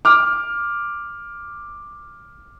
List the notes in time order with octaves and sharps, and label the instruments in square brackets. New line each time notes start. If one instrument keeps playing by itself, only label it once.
[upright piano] D6 F6